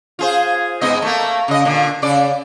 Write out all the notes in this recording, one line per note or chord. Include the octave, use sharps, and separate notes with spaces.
F4 G#4 C5
G#2 B3 D#5
A3 A#3
C#3 D#5
A#2 D3
C#3 D5